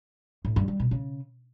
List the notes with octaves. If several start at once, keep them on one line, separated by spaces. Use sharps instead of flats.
A2
G2
G3
B2
C#3